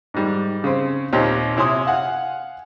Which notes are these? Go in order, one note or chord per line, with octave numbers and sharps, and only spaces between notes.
G#2 D#3 G3
C#3 C4
D#2 A#2 C4 G4 C#5
C3 E4 C#5 G#5 C6 D#6
F5 F#5 G#5